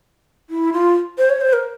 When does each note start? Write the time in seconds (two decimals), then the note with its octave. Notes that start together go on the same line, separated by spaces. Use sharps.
0.50 E4
0.73 F4
1.18 C5
1.30 C#5
1.41 C5
1.53 A#4